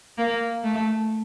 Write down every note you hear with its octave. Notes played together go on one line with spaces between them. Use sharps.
A#3
A3